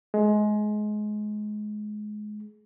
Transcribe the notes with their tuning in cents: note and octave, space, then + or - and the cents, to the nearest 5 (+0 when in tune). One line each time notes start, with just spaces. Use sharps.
G#3 +25